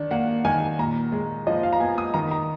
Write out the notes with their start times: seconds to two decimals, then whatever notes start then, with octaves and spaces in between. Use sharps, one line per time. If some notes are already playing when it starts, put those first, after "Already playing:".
Already playing: D#3 D4
0.11 A#3 F#5
0.45 D#3 G#5
0.79 A#2 A#5
1.12 G#3
1.47 F3 D#5
1.63 F5
1.73 A#5
1.80 B3 G#5
1.98 D#6
2.14 D#3 A#5
2.31 A#5